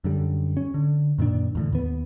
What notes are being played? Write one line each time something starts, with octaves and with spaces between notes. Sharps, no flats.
F#2 D3 G3
C#4
D3
F#2 A#2 D#3 D4
E2 A2 D3
D#2 B3